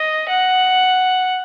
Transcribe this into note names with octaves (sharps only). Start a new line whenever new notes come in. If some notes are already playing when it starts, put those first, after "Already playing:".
Already playing: D#5
F#5